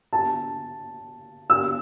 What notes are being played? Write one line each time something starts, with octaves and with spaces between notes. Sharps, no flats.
A5
E6